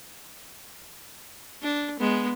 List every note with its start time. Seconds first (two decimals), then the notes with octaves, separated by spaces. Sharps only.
1.63 D4
2.00 G#3 B3